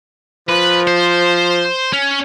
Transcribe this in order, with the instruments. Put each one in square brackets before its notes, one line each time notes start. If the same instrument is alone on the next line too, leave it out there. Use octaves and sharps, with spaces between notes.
[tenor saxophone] F3 [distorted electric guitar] B4
[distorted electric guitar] C5
C#4